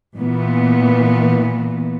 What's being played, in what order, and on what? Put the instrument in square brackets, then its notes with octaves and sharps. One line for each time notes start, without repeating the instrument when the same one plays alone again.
[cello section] A#2 E3 B3